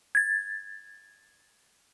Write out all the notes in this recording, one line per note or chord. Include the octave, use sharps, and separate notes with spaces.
G#6 A6